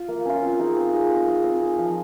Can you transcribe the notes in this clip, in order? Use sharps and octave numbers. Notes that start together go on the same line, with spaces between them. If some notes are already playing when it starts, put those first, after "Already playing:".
Already playing: F4
A#3
C#4 F4
C4
D#4 G#4 D#5
C4
D#4 G#4 D#5
C4
D#4 G#4 D#5
C4
D#4 G#4 D#5
F3